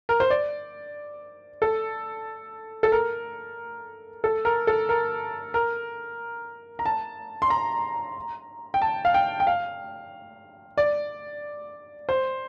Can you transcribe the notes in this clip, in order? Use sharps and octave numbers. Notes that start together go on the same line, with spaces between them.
A#4
C5
D5
A4
A4
A#4
A4
A#4
A4
A#4
A#4
A#5
A5
C6
A#5
G5
A5
F5
G5
G5
F5
D5
C5